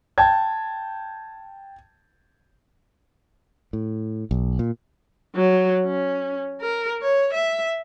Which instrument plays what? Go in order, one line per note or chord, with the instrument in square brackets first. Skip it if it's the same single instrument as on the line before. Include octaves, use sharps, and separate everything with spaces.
[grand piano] G5 A5 G#6
[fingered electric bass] A2
B1
A#2
[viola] F#3
C#4
A#4
C#5
E5